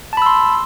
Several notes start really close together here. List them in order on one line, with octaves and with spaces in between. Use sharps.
A5 B5 E6 C6